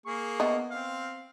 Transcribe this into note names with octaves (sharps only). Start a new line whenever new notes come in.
A#3 G#4 C#6
B3 D#5 E5
C4 F5